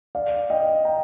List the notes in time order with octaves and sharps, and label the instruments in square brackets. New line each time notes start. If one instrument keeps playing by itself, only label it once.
[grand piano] D5 F5
D#5 G5
G5 A#5